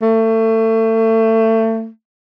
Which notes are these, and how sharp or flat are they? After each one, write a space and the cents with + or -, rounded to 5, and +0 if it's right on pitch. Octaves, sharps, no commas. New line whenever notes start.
A3 +30